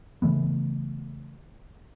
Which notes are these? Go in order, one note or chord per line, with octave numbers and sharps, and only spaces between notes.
C#3 E3 A3 B3